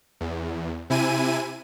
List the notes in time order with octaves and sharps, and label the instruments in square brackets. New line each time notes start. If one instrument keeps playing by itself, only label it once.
[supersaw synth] E2
C3 E4 G#5 D#7